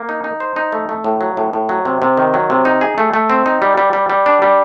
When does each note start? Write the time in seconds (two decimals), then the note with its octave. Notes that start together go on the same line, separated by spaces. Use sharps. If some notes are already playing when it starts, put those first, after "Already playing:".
Already playing: A#3
0.09 D#4
0.24 D#4
0.40 C5
0.56 D#4
0.72 A3
0.89 A3
1.04 A2
1.21 F#3
1.37 A2
1.53 A2
1.69 F#3
1.85 C3
2.02 C3
2.17 D#3
2.34 F#3
2.50 C3
2.65 D#4
2.81 G#4
2.98 A3
3.14 A3
3.30 C4
3.46 D#4
3.62 G3
3.78 G3
3.93 G3
4.10 G3
4.26 D4
4.42 G3